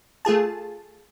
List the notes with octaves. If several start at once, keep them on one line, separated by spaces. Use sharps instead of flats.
A3 F4 G#4 A5